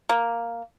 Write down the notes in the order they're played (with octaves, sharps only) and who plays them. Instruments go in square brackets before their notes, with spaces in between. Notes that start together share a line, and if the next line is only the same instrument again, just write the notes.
[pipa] A#3